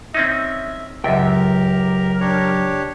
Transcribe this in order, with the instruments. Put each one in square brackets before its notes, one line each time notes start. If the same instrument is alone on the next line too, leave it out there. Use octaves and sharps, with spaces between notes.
[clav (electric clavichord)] C4 C#4 D#4 [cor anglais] E5
[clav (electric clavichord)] C#2 F#2 [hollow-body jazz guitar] F#3 G5 [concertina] G4 [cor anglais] E5
[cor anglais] A#4
[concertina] D4 G4 C#5